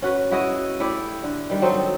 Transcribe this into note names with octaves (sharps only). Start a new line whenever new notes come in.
C#4 F#4 B4
E4 F#4 G#4 D#5
A3 E4 G4 D5
D3
D#3 G3
F#3 C4 D#4 A4